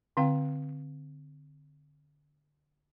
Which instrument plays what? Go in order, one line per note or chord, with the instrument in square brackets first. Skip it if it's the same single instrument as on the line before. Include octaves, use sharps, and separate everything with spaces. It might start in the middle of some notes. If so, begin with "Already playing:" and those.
[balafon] D3 C4 F5 G5